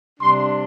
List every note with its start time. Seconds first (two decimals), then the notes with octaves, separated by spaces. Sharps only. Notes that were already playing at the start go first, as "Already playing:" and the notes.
0.20 C3 G3 D4 C6